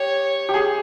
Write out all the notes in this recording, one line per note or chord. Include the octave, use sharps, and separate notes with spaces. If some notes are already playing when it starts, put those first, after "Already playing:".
Already playing: G4 C#5
G4
G#4